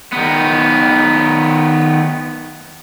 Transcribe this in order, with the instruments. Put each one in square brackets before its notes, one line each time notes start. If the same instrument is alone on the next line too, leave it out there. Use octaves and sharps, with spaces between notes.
[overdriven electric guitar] D#3 B3